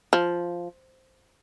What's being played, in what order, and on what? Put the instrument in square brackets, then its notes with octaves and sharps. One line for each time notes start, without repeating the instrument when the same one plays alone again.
[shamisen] F3